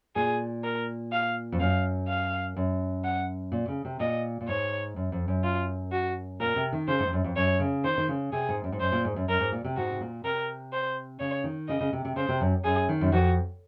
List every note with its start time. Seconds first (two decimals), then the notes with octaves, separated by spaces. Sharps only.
0.16 A#2 G#4
0.64 A#4
1.12 F5
1.52 F2
1.60 F#2 F5
2.08 F5
2.57 F#2
3.04 F#5
3.52 A#2
3.68 C#3
3.85 C3
4.00 A#2 D#5
4.41 A#2
4.48 G#2 C#5
4.96 F#2
5.12 F2
5.28 F#2
5.44 F4
5.92 F#4
6.40 A#2 A#4
6.56 C3
6.73 D#3
6.88 C#3 C5
7.00 G#2
7.07 F2
7.13 F#2
7.24 F2
7.36 F#2 C#5
7.60 C#3
7.84 D#3 C5
7.98 D#3
8.09 C#3
8.32 C3 G#4
8.49 G#2
8.64 F#2
8.72 G#2
8.81 F#2 C5
8.92 A#2
9.05 G#2
9.16 F#2
9.28 F#2 A#4
9.40 G#2
9.52 A#2
9.64 C3
9.77 G#2 F#4
9.90 C3
10.01 A#2
10.24 C3 A#4
10.73 C5
11.20 C#3 C#5
11.44 D#3
11.68 C#3 D#5
11.81 C#3
11.93 C3
12.05 C3
12.16 C#3 C5
12.29 C3
12.41 F#2
12.64 F#2 G#4
12.89 D#3
13.01 F#2
13.12 F2 F#4